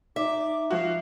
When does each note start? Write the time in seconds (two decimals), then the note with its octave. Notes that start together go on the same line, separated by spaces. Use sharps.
0.16 D#4 E5 D6
0.71 F3 F#4 F5